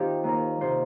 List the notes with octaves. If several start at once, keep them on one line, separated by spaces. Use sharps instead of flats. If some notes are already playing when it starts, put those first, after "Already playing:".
Already playing: D#3 C4 D#4 F4 G4
D#2 D#3 A#4
C3 D#3 C5